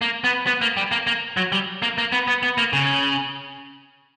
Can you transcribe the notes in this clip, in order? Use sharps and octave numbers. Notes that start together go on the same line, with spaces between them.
A#3
B3
B3
A#3
G3
A#3
A#3
F#3
G3
A#3
A#3
B3
B3
B3
A#3
C#3